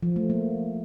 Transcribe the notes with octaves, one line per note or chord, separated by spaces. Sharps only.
F3
A3
A#3